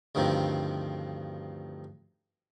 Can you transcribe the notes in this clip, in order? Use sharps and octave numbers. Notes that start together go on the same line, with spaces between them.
D2 G2 D#3 F3 C4